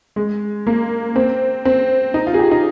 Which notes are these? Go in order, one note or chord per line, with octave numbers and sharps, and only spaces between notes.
G#3
A#3
C4
C4
D#4
F4
G#4
G4
D#4